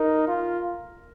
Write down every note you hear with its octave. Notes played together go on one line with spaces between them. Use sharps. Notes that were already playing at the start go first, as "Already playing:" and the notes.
Already playing: D#4 A#4
F4